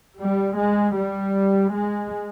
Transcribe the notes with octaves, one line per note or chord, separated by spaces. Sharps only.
G3
G#3
G3
G#3